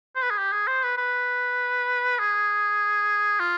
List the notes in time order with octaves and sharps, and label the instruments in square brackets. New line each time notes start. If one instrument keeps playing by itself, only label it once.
[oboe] C5
B4
G#4
G4
G#4
C5
B4
B4
G#4
F4